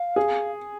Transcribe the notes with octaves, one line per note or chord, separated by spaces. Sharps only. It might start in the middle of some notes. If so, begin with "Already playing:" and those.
Already playing: F5
G#4